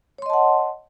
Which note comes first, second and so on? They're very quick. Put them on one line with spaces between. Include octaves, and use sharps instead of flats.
C#5 C6 D#5 A5 F#5